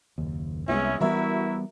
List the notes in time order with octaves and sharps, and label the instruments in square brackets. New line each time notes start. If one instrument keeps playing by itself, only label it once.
[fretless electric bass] F#1 D#2
[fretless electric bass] C2 [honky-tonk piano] G#3 B3 E4 [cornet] C#4
[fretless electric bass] E3 G3 B3 [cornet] E4 [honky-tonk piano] F#4 A#4 E5